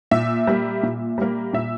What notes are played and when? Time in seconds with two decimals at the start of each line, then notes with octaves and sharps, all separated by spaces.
0.11 A#2 E5
0.47 G3 A#3
0.83 A#2
1.18 G3 A#3
1.53 A#2 E5